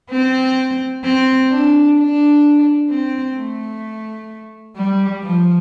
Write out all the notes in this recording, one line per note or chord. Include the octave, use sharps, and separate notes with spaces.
C4
C4
D4
D4
C4
A3
G3
F3